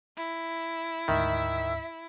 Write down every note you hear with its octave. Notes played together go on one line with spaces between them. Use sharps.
E4
D2 G#2 D#3 E5